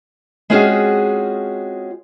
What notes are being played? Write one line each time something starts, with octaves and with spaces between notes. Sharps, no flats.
G#3 C4 C#4 F4 F#4 G#4